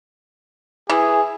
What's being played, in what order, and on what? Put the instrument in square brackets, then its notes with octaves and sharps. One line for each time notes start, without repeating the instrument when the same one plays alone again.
[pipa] E3 [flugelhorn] G#4